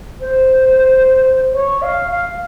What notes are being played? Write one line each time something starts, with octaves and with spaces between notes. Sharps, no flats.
C5
C#5
F5
F5